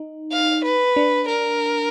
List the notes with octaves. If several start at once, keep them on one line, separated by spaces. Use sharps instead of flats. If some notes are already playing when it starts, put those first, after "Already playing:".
Already playing: D#4
F5
B4
D4
A#4